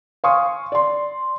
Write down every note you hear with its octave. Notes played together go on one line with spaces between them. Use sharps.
F5 G#5 C6 C#6 D#6
D5 C6